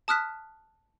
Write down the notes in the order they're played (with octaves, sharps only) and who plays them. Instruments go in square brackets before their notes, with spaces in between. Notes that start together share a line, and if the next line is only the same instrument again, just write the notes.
[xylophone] A5 D#6 F6 F#6 B6